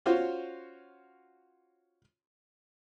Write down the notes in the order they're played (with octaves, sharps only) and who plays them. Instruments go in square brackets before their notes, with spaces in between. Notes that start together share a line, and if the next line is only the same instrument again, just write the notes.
[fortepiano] C#4 F4 F#4 C5 C#5